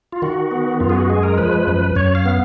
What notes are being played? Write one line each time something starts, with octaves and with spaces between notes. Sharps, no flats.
F4
D#3 F#4
B3
F#2 F4
G#4
F#4
G#3 G#4
A#4
F3 B4
F#2
F#2 C#5
F5
B3